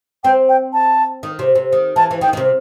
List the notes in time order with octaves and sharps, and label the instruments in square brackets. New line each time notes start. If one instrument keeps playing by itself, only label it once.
[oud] C4 [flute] G5
[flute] G5
A5
[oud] D#3
C3
C3
D#3
[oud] E3 [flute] A5
[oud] E3
[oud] D#3 [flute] G5
[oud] D#3
C3